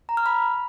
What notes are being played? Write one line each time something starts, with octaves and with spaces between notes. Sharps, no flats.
A#5
F6
B5